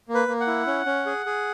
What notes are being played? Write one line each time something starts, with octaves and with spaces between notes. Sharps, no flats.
A#3
B4
A#3
F#5
E4
C#4
C#4
G#4
G#4